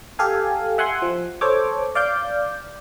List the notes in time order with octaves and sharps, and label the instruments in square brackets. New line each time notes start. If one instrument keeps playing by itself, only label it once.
[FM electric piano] G4 A4 F5 G#5
E5 F#5 G#5 C6
F3
A4 C5 C#5 D6
D5 F5 D6 G6